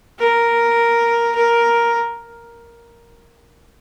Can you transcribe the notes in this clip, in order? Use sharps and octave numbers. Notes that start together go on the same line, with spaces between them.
A#4
A#4